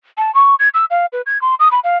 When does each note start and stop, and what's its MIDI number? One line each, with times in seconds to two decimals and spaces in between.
0.18 0.33 81
0.35 0.55 85
0.59 0.69 92
0.74 0.85 88
0.90 1.06 77
1.13 1.22 71
1.26 1.41 92
1.42 1.55 84
1.60 1.69 87
1.71 1.80 83
1.84 1.97 77